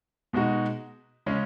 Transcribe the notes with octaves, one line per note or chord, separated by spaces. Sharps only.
B2 G#3 D#4 F#4
C#3 G#3 C#4